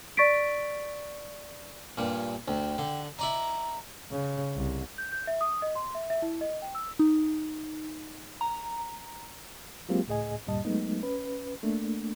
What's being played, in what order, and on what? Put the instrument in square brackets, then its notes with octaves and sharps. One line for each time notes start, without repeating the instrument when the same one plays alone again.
[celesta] D5 C#6 A6 B6 D7
[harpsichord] G2 A#2
[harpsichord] D2 [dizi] G5
[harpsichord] D3
[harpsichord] E4 D5 D#5 [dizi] A#5
[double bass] C#3
C2
[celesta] G6
G6
E5
D#6
D#5
C6
E5
E5
E4
D#5
G5
E6
[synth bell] D#4
A#5
[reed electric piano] F#3 G#3 A#3 C4 F4 G4
C#2 A2 G#4 D#5 G#5
D2 G2 A#2 G3 D#5 A5
F#3 G#3 A3 B3 D#4
C#4 B4
A3 A#3 D4